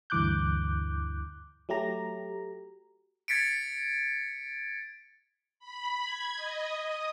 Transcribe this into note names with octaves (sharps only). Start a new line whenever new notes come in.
D2 G2 E3 D6 F#6 G6
F#3 A3 G4 A#5
G#6 A6 B6 C#7 D7
B5
G#6
D#5
D#6